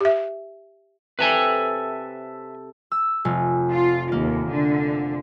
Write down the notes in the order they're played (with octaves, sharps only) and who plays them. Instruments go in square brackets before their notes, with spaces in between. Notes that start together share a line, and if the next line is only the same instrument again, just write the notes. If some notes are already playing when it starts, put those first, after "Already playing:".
[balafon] G4 E5
[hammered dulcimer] C3 A4 [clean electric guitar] B4 E5 G#5
[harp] E6
F1
[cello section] F4
[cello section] D#2 [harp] A#3
[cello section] D3